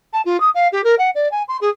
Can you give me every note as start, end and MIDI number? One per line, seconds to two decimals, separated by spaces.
0.13 0.21 81
0.25 0.39 65
0.40 0.49 87
0.54 0.67 77
0.72 0.81 67
0.83 0.95 70
0.98 1.10 78
1.15 1.28 74
1.31 1.42 80
1.48 1.57 84
1.61 1.69 68